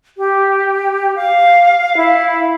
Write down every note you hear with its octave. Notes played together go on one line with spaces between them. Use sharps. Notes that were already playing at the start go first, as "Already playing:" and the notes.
G4
F5
E4